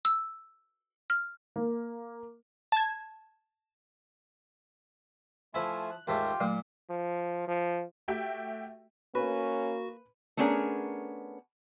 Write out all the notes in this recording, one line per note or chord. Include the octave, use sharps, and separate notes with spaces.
E6
F6
A#3
A5 G#6
F3 A3 E4 F4 G#5
F#6
D#2 G#2 A3 F4 G4 G5
A#2 F#3 A3
F3
F3
A3 F#4 G4 E5 G5
A#3 C#4 F#4 B4
A3 B3 C#4 D4 G#4 A#4